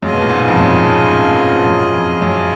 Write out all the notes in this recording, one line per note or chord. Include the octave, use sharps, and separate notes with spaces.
F#2 F4 G#4 D#5 G#5
B2
A#2
G#2
F2
F#2
C#3
A#2
A#2
G#2
F#2
F2
F#2